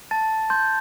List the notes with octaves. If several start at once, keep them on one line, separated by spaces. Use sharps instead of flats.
A5 A6
C6 G6